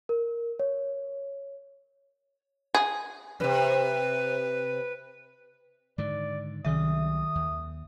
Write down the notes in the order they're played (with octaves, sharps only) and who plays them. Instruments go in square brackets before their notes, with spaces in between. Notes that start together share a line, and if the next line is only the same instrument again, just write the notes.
[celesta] A#4
C#5
[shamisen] G#4
[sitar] F#2 C3 [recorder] B4
[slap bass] G#2 D3 D#3 [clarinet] D5
[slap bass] C2 C3 F#3 [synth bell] D#3 E5 [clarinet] D#6
[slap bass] D#2